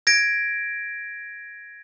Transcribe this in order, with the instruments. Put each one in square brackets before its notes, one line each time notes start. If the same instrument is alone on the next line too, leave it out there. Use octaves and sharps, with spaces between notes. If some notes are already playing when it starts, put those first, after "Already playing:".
[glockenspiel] G#6 A#6 D7